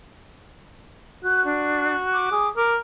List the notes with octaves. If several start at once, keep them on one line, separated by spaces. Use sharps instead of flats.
F#4 F#6
D4
D6
G#4
A#4 D6